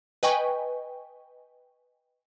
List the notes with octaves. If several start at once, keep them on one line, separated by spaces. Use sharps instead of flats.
B4 D#5 G5 G#5 C#6